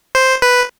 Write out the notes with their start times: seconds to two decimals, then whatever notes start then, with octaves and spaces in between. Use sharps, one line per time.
0.15 C5
0.42 B4